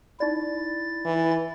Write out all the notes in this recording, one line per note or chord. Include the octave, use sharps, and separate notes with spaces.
D#4 E4 D5 A6
E3